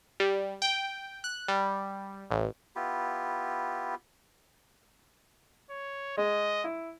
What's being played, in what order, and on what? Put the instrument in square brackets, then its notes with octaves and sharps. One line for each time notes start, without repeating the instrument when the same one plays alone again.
[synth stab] G3
G5
F#6
G3
A1
[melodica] B3 E4 F4 G4
[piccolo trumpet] C#5
[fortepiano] G#3 [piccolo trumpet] D#5
[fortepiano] E4